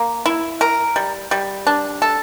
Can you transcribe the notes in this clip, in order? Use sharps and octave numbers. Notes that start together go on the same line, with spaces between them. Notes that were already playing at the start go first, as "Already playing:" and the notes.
Already playing: A#3
E4
A#4
G3
G3
D4
A4